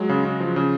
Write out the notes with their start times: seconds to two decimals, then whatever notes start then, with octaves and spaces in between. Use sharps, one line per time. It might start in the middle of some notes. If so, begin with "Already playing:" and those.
Already playing: F#3 G#3
0.09 C#3
0.25 C#3
0.41 F3
0.56 C#3